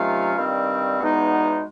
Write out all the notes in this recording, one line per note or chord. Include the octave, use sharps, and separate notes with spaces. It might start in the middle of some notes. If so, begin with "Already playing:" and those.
Already playing: C3 D#3 F#3 A3 C#4 F4 F5
G2 D#3 G3 C4
E2 B2 G#3 B3 D#4